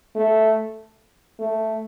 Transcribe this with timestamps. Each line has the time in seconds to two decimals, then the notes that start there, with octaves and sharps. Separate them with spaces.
0.16 A3
1.39 A3